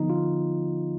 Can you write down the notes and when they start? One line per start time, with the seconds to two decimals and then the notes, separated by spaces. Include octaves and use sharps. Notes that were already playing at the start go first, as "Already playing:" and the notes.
Already playing: D3 F3 B3 D#4
0.10 F4